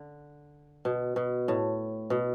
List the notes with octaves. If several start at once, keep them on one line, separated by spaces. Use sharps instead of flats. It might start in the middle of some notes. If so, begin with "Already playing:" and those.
Already playing: D3
B2
B2
A2
B2